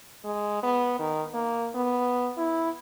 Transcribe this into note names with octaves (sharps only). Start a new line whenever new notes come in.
G#3
B3
D#3
A#3
B3
E4